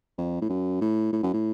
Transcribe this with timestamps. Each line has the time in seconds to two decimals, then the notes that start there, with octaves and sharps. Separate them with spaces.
0.18 F2
0.41 A2
0.49 F#2
0.81 A2
1.12 A2
1.23 F#2
1.34 A2